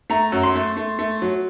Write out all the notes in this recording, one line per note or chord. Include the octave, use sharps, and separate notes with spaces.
A3 A#5
F#2
C6
A3
A3
A3
F#3